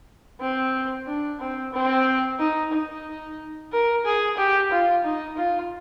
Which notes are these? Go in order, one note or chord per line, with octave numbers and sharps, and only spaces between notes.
C4
D4
C4
C4
D#4
D#4
A#4
G#4
G4
F4
D#4
F4